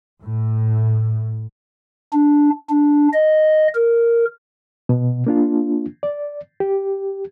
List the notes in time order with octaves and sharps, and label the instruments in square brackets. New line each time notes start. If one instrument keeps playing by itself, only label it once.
[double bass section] A2
[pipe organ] D4
D4
D#5
A#4
[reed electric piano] B2
A#3 D4 F4
D5
G4